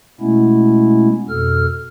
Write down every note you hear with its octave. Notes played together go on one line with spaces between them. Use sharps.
B2 G#3 A3 B3 C#4 E4
F2 B2 A4 F6